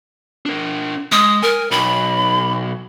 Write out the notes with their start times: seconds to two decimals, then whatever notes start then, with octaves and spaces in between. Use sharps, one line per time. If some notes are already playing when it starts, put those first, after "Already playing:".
0.46 D4 A#4
1.12 G#3 D#6
1.42 A#4 G#5
1.71 B1 B5